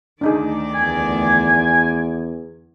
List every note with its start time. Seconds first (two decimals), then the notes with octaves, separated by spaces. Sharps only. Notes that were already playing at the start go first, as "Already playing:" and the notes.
0.21 D2 D#3 D4 D#4 G#4 D5
0.75 E2 G#5